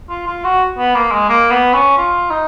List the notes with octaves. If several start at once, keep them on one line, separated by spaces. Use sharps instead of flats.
F4
F4
F#4
B3
A#3
G#3
A#3
B3
C#4
F4
D#4